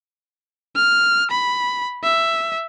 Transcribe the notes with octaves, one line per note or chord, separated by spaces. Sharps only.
F6
B5
E5